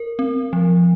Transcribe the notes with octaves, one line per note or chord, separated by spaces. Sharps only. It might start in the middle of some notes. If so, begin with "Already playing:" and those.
Already playing: A#4
C4
F3